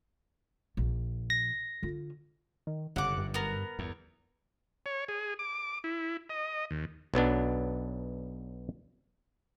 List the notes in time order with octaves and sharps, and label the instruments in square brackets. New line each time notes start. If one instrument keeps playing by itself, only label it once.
[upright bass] A#1
[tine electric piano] A#6
[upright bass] D3 F4
[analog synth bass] D#3
[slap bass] G1 F#2 [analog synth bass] C#3 [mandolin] F#5 D6
[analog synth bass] G2
[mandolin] B3 A#4
[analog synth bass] G1 [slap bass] E2
[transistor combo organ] C#5
G#4
D6
E4
D#5
D#2
[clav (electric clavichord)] B1 F#3 B3 D4